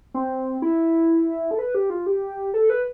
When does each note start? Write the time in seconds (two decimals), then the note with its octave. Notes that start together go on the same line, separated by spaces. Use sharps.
0.14 C4
0.62 E4
1.51 A4
1.59 B4
1.75 G4
1.90 F4
2.06 G4
2.54 A4
2.70 B4